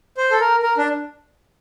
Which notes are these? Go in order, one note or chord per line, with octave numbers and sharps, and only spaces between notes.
C5
A4
A#4
A#4
D4